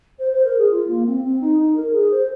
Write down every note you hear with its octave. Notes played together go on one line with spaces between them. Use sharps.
C5
C5
A#4
G#4
F4
A#3
C4
C4
D#4
D#4
A#4
G#4
C5